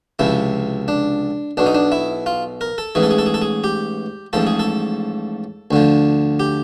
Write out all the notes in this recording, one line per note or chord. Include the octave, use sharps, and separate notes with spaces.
C#2 C3 F3 E4
D4
B1 B2 D4
D#4
D4
E4
F4
A#4
A4
A1 G#2 E3 G#4
A4
G#4
A4
G#4
A4
G#4
G4
A1 G#2 F3 A4
G#4
A4
D2 D3 F3
G4